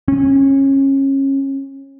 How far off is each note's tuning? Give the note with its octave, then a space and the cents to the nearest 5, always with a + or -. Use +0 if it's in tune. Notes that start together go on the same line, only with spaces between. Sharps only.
C#4 -25